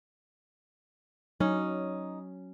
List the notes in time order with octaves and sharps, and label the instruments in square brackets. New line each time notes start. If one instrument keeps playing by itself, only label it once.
[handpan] F#3 [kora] C#4 [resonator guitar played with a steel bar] D#4